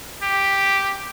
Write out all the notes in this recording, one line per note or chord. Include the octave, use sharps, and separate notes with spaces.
G4